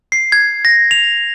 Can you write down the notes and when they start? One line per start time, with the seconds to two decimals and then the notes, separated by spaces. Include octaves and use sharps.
0.12 C7
0.32 G#6
0.65 A#6
0.91 F7